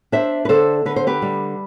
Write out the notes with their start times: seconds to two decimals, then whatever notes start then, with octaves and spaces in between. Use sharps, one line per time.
0.12 D4 C5 E5
0.45 B4
0.49 D3 A4 C5
0.85 D3 B4
0.96 C5
1.07 G4 B4
1.22 G3